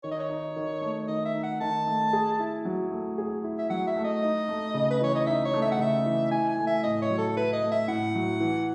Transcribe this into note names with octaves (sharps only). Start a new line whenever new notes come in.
D#3 C#5
D#5
C#5
D#4
D#3
A3
D#3 D#5
E5
D#4
F#5
D#3 A5
A3
G#4
E4
F#3
A3
G#4
E4
E5
F#3 F#5
E5
A3
D#5
D#4
A3
C#3
B4
E3 C#5
D#5
D#4 E5
C#5
A3
E5
F#5
C#3 E5
E3
E4 G#5
G#5
A3
E5
A2 D#5
C#5
F#3
A4
E4 B4
D#5
A3
E5
A2 F#5
F#3
E3